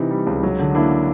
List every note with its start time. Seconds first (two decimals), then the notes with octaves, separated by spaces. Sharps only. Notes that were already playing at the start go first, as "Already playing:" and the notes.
Already playing: C3 E3 D#4
0.11 G3
0.27 C#2
0.43 F#3
0.59 D3
0.75 A#3 D4 E4